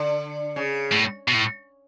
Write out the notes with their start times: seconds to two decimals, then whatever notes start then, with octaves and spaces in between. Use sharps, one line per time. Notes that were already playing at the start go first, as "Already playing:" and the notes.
Already playing: D3
0.56 C#3
0.92 A2
1.28 B2
1.34 A2